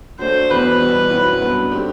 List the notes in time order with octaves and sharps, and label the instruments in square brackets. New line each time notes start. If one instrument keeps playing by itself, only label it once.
[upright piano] F#3 A3 D4 [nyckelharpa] C5
[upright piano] E2 B2 F#3 [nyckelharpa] B4
[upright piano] E2 B2 G3
F#2 F#3 C4 E4
G2 F#3 B3 D4
D3 A3 C4 G4